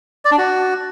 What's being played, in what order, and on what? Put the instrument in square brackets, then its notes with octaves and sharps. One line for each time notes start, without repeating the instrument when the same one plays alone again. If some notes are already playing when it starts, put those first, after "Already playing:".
[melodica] D5
D4
F#4